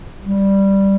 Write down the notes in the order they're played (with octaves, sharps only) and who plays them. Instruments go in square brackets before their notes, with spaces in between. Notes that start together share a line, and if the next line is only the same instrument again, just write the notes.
[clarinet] G3